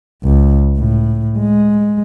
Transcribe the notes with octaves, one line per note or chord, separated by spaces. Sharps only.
C#2
A2
G#3